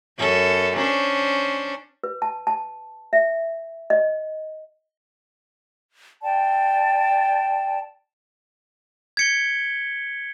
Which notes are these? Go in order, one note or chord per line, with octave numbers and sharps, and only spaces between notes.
F#2 C#4 A4
C#4 D4 C5
B4
A5
A5
E5
D#5
D5 G5 A5
G#6 B6 C#7 D7 G7